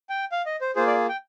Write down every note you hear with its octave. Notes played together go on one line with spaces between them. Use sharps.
G5
F5
D#5
C5
A#3 F4 G#4 C5
D5
G5